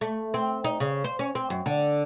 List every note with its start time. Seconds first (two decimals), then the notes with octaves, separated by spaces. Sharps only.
0.01 A3
0.34 C4
0.64 D#4
0.80 C#3
1.04 C5
1.19 C#4
1.35 C4
1.50 F#2
1.66 D3